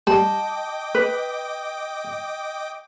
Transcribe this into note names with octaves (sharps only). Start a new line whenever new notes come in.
G3 D#5 G5 A5 D6
B4